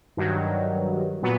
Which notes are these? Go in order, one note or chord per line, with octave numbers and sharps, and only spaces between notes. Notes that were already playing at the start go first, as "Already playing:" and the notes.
G2 D#3 F#3
A#2 F#3 B3